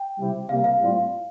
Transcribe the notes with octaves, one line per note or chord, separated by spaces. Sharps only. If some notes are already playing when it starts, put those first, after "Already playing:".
Already playing: G5
C3 G3 C4 E4 G4
C2 C3 G3 A#3 F5
F5
A2 G3 C4 F4